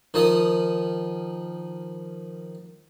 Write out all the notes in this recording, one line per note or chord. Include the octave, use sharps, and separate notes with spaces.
D#3 F3 D#6